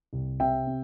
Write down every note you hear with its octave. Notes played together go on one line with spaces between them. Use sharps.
C2
C3 E5 G5
C4